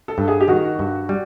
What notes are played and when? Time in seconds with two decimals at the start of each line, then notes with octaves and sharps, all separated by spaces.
0.08 A4
0.18 G2
0.28 G#4
0.40 G4
0.48 D#3 F#4
0.79 G2
1.09 G3